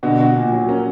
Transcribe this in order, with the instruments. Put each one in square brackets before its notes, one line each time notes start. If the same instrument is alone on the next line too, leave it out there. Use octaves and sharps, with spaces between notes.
[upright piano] B2 D3 [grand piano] F#4
[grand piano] F#4
A#2
F#3
[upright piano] A#3 C#4